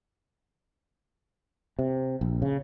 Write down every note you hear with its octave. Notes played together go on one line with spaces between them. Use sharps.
C3
A#1
C#3